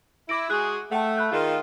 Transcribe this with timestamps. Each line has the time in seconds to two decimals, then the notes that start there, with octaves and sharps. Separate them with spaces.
0.29 E4 D6 A#6 D7
0.50 G#3 F#4 G#4 F#6
0.92 A3 F#5 G5 A5
1.17 B5 F#6 G6
1.32 D#3 F4 G#4 A#4